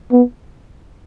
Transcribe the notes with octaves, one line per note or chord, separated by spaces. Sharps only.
B3